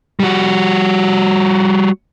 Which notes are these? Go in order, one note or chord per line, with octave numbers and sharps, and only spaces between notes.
G3 F#4